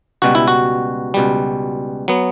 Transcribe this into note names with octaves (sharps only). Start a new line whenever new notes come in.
C#2 B2 G3 F#4
E4
F#4
C#2 B2 G3
F#3 B3